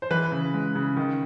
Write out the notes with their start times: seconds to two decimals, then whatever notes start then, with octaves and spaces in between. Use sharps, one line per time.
0.02 C5
0.11 E3 B4
0.32 C#3
0.54 G#3
0.75 C#3
0.97 D#3